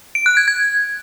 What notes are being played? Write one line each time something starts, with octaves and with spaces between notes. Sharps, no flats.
D7
F#6
G#6
G#6